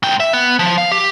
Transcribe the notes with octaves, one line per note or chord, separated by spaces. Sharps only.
G#2 G5
E5
B3
F3
F5
G4